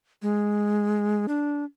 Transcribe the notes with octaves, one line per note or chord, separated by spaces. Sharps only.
G#3
D4